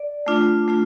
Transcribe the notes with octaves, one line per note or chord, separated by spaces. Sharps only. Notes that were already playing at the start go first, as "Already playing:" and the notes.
Already playing: D5
A3 D4 F4
A3 D4 F4